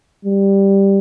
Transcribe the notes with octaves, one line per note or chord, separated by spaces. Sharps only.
G3